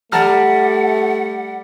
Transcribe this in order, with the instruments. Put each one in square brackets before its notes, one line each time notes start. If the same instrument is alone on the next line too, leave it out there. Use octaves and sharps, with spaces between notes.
[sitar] G3 [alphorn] A3 [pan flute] F#5 [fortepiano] A5 A#5 F6